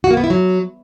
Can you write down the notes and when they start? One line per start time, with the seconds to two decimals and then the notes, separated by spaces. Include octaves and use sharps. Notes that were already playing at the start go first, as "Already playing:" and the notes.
0.04 F#4
0.11 A#3
0.17 B3
0.24 E4
0.30 F#3